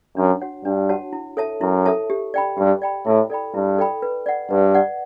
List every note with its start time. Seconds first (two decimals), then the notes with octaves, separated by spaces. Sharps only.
0.17 F#2 D4
0.40 F#4 C#5 F#5 A5
0.65 G2 D4
0.89 F#4 C#5 F#5 A5
1.13 E4
1.37 A4 C#5 E5 A5
1.61 F#2 E4
1.86 A4 C#5 E5 A5
2.10 G4
2.34 D5 G5 B5
2.58 G2 G4
2.82 D5 G5 B5
3.06 A2 E4
3.30 A4 D5 G5 B5
3.54 G2 E4
3.78 A4 D5 G5 B5
4.02 B4
4.26 D5 F#5
4.51 G2 B4
4.74 D5 F#5